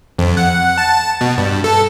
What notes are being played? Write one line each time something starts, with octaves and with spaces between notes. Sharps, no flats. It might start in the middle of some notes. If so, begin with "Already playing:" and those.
F2
F#5
A5
B2
G2
A4